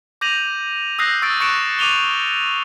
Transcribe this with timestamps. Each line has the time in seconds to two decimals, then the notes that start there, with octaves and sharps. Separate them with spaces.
0.21 D6 G6 A#6 D#7 F7 F#7
0.99 D#6 E6 F#6 G6 A#6 C7
1.22 C#6 E6 A6 D7
1.40 C#6 F#6 A6 C#7 D7 E7
1.79 D6 D#7 F7 G7